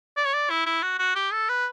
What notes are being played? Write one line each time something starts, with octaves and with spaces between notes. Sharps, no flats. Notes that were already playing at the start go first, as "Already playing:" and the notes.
D5
C#5
D5
E4
E4
F#4
F#4
G4
A4
B4